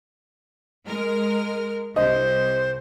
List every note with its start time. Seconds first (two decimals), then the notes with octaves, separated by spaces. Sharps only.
0.84 G#3 A#4 F6
1.96 C2 C5 D#5